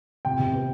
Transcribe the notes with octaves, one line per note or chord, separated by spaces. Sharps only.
C3 G5
C3
B3